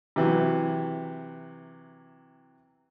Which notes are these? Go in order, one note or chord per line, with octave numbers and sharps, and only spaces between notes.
C3 E3 F#3